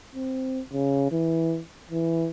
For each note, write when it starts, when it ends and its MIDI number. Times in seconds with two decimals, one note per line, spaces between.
0.15 0.60 60
0.73 1.11 49
1.11 1.59 52
1.91 2.29 52